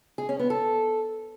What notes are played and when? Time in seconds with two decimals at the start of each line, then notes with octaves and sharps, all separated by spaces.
0.18 G#4
0.29 C#4
0.39 B3
0.50 A4